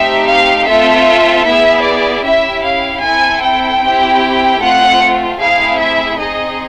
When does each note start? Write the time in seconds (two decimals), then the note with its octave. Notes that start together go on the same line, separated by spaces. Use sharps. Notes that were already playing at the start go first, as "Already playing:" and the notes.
Already playing: A3 C4 D#4 G4 E5
0.29 F5
0.67 A3 C4 F4 A4 E5
1.46 B3 E4 G#4 E5
1.85 D5
2.24 C#4 E4 G4 E5
2.64 F5
3.03 C4 E4 A4 G#5
3.43 G5
3.82 C4 E4 G4
4.60 A3 C4 F4 F#5
5.39 A3 C4 E4 G#4 F5
5.79 E5
6.18 C4 D#4 G#4 D#5